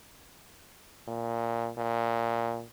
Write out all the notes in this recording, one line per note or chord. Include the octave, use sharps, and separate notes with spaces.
A#2
A#2